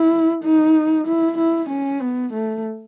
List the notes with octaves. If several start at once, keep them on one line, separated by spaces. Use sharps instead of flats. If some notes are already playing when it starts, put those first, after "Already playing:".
Already playing: E4
D#4
E4
E4
C#4
B3
A3